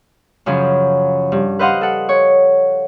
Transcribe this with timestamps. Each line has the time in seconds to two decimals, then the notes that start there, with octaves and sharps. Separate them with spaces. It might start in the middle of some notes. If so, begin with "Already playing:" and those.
0.46 F#2 C#3 F3 F#3 C#4
1.32 G2
1.59 B4 C5 D#5 F5 F#5 C6
1.81 A4 F#5
2.09 C#5